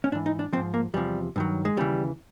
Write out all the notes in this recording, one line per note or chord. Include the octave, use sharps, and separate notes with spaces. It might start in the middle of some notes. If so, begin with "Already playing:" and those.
C#4
G#2 E3 D4
D#4
D4
G#2 F3 C4
A#3
E2 C3 F3 G3
G2 D#3 F#3
G#3
D#2 C#3 E3 G3